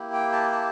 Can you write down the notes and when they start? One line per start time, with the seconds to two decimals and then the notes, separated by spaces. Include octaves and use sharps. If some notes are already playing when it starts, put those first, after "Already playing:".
Already playing: A#3 E4 G4
0.13 G5
0.33 A5
0.52 A5